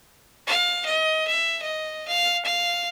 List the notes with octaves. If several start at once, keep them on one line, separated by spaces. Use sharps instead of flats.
F5
D#5
E5
D#5
F5
F5